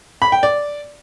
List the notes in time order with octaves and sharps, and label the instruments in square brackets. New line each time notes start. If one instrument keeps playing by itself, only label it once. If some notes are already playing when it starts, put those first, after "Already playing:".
[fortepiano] B5
G5
D5